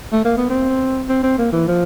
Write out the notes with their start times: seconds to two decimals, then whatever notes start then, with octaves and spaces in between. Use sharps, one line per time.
0.13 A3
0.25 A#3
0.37 B3
0.50 C4
1.09 C4
1.23 C4
1.38 A#3
1.52 E3
1.68 F3